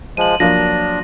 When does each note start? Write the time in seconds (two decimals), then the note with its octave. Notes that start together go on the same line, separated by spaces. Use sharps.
0.17 F3 G#3 D#7 F#7
0.40 F3 F#3 A#3 D4 A#6